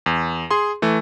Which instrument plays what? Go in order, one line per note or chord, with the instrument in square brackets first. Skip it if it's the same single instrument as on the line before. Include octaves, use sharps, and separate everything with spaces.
[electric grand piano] E2
G#4 C6
E3 A3